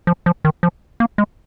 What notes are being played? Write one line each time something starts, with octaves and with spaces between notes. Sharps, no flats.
F3
F3
D#3
F3
A#3
G#3